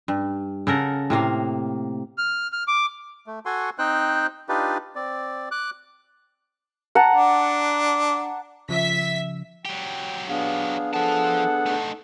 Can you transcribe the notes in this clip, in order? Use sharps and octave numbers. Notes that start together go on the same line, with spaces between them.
G2
C#3 A4 A#4 F#5
A2 C3 A#3 F5
F6
F6
D6
A3
F#4 A4 F#5 G#5 C6 C#6
C4 D#4 C5 G5 F#6
D4 D#4 F4 G4 B4 D5
C4 D5
D6 F#6
F#5 A5 A#5
D4
C#3 F3 E5 B6
F#3 G4 G5
B3 D4 G#4 F5
F3 A4 F#5 A5
A3 D#4